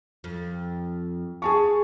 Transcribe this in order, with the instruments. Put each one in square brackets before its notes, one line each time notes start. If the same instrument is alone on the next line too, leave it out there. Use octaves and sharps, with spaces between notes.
[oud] F2
[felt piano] G#4 A5 C#6